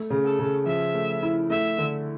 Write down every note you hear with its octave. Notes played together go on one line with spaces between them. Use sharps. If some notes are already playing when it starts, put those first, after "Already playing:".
Already playing: A3
C#3
A4
C#3
F3 E5
A3
E4
A3 E5
D3